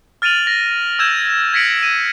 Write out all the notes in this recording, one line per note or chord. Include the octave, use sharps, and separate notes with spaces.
F6 A6 D7 D#7 F7 F#7
A#6
E6 G6 G#6 E7
G#6 A#6 B6 C#7 D7 F#7
D#7